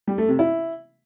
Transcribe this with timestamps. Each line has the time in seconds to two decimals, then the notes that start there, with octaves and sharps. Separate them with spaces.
0.07 G3
0.18 A3
0.28 C3
0.39 E4